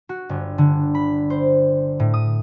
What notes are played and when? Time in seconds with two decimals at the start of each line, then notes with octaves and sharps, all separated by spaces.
0.09 F#4
0.29 G1
0.58 D3
0.95 B5
1.30 C5
2.00 A2
2.14 D#6